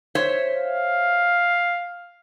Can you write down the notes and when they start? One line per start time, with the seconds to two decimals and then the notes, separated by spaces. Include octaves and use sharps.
0.15 C5 C#5 E5
0.56 F5